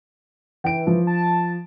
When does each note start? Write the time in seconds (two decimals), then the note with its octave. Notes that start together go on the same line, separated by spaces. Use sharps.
0.64 E3 G5 D7
0.87 F3
1.07 A5